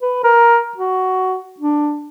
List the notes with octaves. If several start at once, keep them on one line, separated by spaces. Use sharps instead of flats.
B4
A#4
F#4
D4